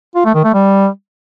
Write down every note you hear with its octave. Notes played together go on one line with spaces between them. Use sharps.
F4
A3
D#3
A3
G3